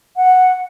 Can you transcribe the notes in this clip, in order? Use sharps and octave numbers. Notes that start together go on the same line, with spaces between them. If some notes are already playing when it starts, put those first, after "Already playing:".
F#5